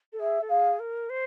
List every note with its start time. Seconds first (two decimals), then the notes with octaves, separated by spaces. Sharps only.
0.13 A4
0.20 G#4 E5
0.41 A4
0.49 G#4 F5
0.80 A#4
1.10 C5